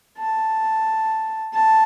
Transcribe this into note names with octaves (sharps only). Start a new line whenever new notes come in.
A5
A5